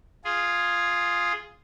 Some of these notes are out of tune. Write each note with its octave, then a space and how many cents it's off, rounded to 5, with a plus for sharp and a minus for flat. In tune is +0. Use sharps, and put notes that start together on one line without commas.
F4 +0 G#4 +0